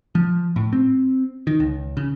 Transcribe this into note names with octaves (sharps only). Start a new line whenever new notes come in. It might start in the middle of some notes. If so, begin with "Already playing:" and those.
F3
A2
C4
D#3
C#2
C#3